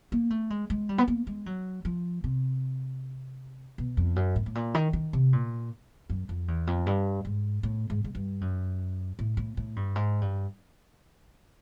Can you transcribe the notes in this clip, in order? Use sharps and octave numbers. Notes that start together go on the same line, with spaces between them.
A#3
A3
G#3
G#3
G3
B3
A#3
G#3
F#3
F3
C3
B2
F2
F#2
A2
A2
A#2
D#3
D#3
C3
A#2
F#2
F2
E2
F2
G2
G#2
A2
G#2
G#2
G2
F#2
A2
A2
A2
G2
G#2
G2